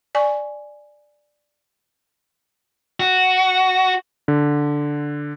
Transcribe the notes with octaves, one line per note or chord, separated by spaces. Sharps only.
D5 G#5 C#6
F#4
D3